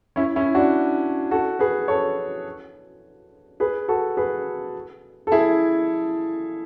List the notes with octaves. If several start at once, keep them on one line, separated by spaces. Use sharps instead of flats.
C#4 E4
C#4 E4
D4 F#4
F#4 A4
G#4 B4
A4 C#5
G#4 B4
F#4 A4
G#4 B4
A4
E4 G#4